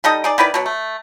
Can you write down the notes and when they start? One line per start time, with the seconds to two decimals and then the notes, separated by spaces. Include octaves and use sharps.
0.04 G3 D#4 A4 D#5
0.24 D#4 G#4 D5
0.38 D#3 E4 B4 D5
0.54 B2 F#3
0.66 A3